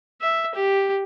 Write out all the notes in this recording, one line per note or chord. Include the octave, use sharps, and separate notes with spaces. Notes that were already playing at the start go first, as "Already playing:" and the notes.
E5
G4